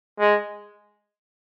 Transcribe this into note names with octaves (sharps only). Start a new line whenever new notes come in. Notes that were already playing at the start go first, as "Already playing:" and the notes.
G#3